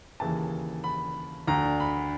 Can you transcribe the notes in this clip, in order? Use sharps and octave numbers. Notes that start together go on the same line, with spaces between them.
D#2 C#3 E3 A5
B5
D2 D3 A#5
B5